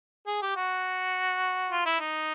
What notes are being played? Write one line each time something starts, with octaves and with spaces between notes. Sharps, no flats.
G#4
G4
F#4
F4
E4
D#4